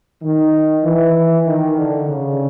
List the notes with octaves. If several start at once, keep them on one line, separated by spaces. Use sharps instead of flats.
D#3
E3
D#3
D3
C#3